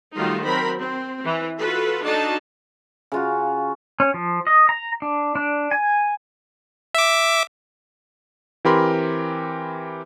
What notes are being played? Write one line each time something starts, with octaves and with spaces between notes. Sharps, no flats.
D#3 F#3 G3 A3 D#4 F4
F#3 C4 A#4 C5 B5
C4
E3
F4 F#4 A4 B4
D4 D#4 F#4 A4 A5
C#3 F4 F#4
C#4
F3
D#5
A#5
D4
D4
G#5
E5 D6
E3 C4 G4 A#4 B5 C6